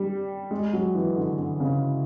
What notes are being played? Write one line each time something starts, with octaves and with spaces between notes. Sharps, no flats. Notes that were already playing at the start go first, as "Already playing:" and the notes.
Already playing: G3
G#3
F#3
E3
D3
D3
C#3